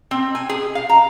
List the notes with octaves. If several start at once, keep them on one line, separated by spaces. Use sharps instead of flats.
C4
G#5
G#4
F5
A#5